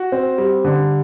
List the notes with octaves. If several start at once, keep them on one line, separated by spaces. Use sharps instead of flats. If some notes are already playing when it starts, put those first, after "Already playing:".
Already playing: F#4
C4
G3
D3